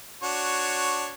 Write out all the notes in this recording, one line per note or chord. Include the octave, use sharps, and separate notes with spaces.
D4 F#4 C#5